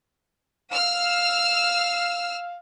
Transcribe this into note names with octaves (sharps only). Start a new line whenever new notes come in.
F5 E6 F6